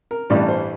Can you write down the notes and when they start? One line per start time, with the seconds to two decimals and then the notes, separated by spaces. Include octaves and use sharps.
0.11 A#4
0.30 A1 G2 E3 G3 D5
0.48 C5